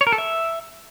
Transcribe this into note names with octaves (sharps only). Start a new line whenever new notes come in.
C#5
A#4
A4
E5